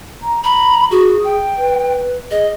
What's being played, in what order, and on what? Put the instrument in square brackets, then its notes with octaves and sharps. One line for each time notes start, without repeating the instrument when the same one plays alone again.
[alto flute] A#5
[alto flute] A#5 [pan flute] B5
[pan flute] F#4 [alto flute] G#4
[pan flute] G5
[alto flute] B4
[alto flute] G#4 [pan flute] D#5